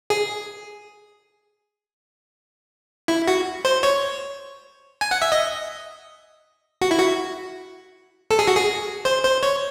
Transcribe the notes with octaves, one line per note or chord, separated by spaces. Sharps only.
G#4
E4
F#4
C5
C#5
G#5
F#5
E5
D#5
F#4
E4
F#4
A4
G#4
F#4
G#4
C5
C5
C#5